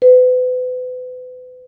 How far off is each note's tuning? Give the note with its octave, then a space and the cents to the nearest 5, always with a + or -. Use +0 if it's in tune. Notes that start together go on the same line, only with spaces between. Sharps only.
B4 +35